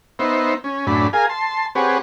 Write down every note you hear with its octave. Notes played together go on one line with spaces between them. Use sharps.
B3 D#4 C5 E5
C#4
F#2 A2 D4 B5
G#4 A#4 F5 G#5
A5 C6
C4 G4 G#4 B4 C#5 F#5